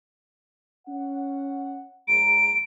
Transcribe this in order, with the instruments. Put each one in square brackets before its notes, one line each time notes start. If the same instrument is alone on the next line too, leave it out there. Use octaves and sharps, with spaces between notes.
[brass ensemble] C#4 F#5
[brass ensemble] A#1 G#3 A#5 [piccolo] D7